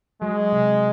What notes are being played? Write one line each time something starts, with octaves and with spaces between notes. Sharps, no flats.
F#3 G#3
C3